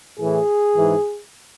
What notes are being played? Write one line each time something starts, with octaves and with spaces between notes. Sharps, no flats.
A2 E3 G#4
G#2 E3